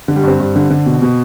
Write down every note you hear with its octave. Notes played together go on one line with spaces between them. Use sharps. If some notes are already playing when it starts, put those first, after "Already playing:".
D3
G3
G2 C4
G2
D3
D3
B2
B2